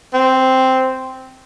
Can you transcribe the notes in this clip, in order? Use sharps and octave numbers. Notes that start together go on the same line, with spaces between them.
C4